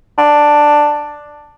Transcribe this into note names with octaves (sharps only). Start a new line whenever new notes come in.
D4